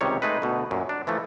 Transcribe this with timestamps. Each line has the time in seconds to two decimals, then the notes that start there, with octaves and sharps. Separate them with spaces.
0.01 C#2 C3 D#3 G3 C#5
0.22 G#3 A3 D#4 B4
0.42 D2 B2
0.71 F#2 A#2
0.89 D4
1.07 E3 F3 A3 A#3